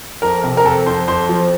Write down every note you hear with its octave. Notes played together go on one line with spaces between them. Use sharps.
F2 A#4
C3
A#4
F2 A4
F2 C5
F2 C5
F3